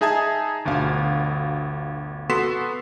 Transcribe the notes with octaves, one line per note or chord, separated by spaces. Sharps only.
D#4 G#4 E5 G#5 A5 G#6
G1 D2 B2 F5
B3 F#4 A4 C6 B6 E7